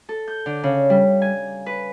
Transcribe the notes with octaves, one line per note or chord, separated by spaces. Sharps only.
A4
G6
D3
C#3
G3
G#5
B4